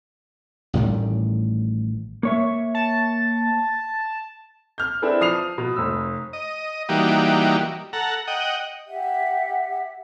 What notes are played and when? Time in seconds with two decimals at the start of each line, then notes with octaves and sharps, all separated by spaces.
0.73 A1 A2 D#3 G3
2.23 A#3 C#5 E5
2.74 A5
4.78 F6 G6
5.02 C4 D4 E4 G#4 A4 B4
5.21 F3 D#6 C7 F7
5.58 B2
5.76 F1 E6
6.33 D#5
6.89 E3 G3 A#3 D#4 F#4 G4
7.93 A4 F#5 A#5
8.28 D#5 F#5 G5
8.87 G4 E5 F#5